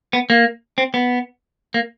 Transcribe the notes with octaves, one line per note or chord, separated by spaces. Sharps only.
B3
A#3
C4
B3
A#3